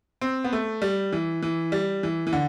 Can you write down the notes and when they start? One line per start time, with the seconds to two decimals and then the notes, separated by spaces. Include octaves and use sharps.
0.21 C4
0.44 B3
0.53 A3
0.82 G3
1.12 E3
1.42 E3
1.72 G3
2.03 E3
2.27 E3
2.33 D3